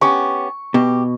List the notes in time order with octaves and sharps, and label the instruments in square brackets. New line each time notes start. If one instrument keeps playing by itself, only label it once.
[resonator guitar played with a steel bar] B3 C#4 G4 [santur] C#6
[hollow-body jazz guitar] B2 [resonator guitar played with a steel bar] G4